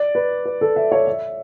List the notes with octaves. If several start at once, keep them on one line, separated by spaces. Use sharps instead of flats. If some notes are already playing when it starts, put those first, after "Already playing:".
Already playing: D5
B4
B4
A4
E5
C#5
E5